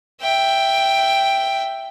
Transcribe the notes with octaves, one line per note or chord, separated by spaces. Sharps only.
E5 G5